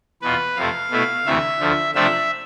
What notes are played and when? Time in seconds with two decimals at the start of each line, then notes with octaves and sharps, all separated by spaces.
0.22 E2 B2 B3 F4 B4
0.56 F2 C3 F3 A3 F5
0.91 B2 A3 E4
1.26 D2 C3 E3 A3 E5
1.60 D2 D3 F3
1.94 C3 F3 A3 D4 F4 E5